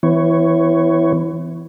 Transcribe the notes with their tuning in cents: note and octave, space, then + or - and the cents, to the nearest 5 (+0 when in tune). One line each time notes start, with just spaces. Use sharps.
E3 +0 B3 +40 C#5 +0